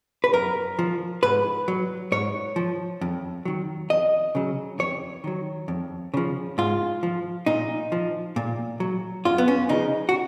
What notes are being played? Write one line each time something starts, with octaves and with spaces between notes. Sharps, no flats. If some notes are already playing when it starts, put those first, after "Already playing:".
B4
F#2 A#4
F3
G#2 B4
F#3
G#2 C#5
F3
F2
D#3 F#3
F2 D#5
C#3 F#3
F2 C#5
D#3 F#3
F2
C#3 F3
G#2 F4
F3
A#2 D#4
F3
A#2
F#3
F#2 F4
B3
C#4
C#3 F3 D#4
F#4